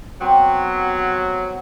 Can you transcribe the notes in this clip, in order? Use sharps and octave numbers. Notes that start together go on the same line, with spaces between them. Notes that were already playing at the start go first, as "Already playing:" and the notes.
F#3 B3 C4 G4